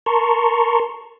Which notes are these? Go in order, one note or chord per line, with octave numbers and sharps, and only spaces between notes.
A#4 A5 A#5 C6 C#6